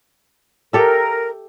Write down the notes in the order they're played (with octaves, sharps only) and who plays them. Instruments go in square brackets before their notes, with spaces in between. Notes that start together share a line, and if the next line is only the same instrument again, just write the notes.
[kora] G4 A4 E5 [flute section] A#4